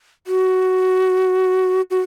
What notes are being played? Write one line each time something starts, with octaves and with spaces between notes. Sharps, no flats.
F#4
F#4